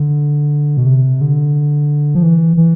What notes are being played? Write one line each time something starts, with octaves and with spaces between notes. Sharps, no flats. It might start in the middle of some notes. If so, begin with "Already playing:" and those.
Already playing: D3
B2
C3
D3
F3
E3
E3